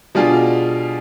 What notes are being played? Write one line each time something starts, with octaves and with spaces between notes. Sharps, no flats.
B2 G3 D4 F4 G#4